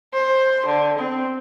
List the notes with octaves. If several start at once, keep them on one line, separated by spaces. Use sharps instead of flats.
C5
D3
C4